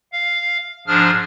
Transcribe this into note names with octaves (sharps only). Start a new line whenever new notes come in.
F5
G#2 F3 D4 G#4 F6